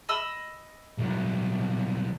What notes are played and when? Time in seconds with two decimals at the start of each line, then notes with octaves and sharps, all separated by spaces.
0.09 D#5 B5 E6
0.98 C2 F#3